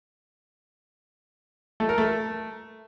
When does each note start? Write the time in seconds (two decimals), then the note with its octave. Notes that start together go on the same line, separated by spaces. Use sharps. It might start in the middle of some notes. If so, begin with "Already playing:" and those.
1.80 A3
1.89 A#4
1.98 A3